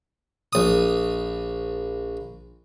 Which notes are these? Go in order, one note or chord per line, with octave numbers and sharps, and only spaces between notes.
A#1 D#6